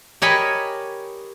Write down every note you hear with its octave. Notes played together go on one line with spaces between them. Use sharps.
G4 A#4 C#5 D#5 G#5 B5